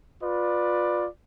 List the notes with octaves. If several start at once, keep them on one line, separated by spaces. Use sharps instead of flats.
F4 B4 D5